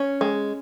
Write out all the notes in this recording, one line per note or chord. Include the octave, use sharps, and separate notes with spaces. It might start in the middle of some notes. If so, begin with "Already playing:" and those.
Already playing: C#4
G#3